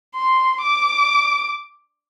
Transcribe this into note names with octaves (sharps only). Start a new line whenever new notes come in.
C6
D6